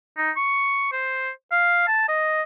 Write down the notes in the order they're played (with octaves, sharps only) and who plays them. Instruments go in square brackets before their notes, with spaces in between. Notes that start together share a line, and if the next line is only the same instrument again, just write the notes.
[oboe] D#4
C#6
C5
F5
A5
D#5